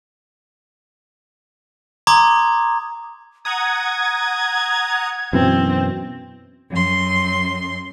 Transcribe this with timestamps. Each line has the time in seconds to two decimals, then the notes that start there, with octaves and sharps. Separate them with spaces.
2.07 A#5 C6 D6 D#6 G#6
3.45 F#5 A#5 D#6 G#6
5.33 F#2 B2 E3 C4
6.70 F#2 C6